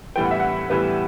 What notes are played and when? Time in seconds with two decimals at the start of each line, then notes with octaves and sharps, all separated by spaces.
0.16 A2 E3 G3 B3 G5
0.24 F#5
0.31 E5
0.39 F#5
0.70 A2 E3 G3 B3 B4